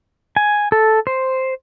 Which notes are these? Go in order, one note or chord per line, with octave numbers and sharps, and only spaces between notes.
G#5
A4
C5